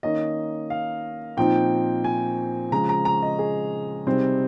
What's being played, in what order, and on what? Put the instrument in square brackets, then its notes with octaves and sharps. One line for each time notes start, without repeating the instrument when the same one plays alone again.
[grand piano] D#3 A#3 C#4 D#5
F5
A#2 F3 C4 D#4 G5
G#5
C#3 F3 G#3 A#5
A#5
A#5
D#5
G#4
C3 G3 C4 D#4